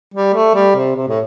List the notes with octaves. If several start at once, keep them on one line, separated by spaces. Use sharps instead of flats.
G3
A3
G3
C3
C3
A2